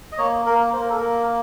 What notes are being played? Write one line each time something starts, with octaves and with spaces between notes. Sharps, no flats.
D#5
A#3 C#5
A#3 A#4
A#3 C5
A#4
A4
A#3 A#4